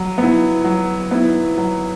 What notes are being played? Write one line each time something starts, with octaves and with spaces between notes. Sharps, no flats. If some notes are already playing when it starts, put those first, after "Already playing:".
Already playing: F#3
B3 E4
F#3
B3 E4
F#3